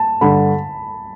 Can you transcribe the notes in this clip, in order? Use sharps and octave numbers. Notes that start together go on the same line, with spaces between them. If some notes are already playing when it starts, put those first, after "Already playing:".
Already playing: A5
G2 D3 B5